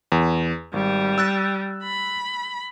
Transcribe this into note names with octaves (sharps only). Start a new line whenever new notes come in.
E2
G#1 G3
E6 F#6 A6
B5